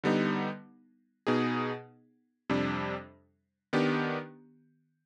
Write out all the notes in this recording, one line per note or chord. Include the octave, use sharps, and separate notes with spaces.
D3 G3 B3 D#4
B2 B3 D#4 G#4
F2 C3 G3 D4
D#3 B3 D4 G4